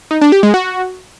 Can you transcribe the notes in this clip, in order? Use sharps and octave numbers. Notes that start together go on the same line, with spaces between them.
D#4
D4
G4
G#3
F#4